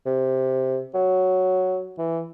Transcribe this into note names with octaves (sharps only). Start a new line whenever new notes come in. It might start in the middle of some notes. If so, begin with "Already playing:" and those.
C3
F#3
E3